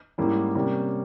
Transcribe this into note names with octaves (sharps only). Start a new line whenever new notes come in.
G#2 G3 A#3 C#4 E4
C3 G3 A#3 C#4